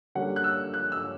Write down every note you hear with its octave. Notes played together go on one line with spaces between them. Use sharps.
D3 G3 A#3 C#4 F#5
F#6
E6
F#6
E6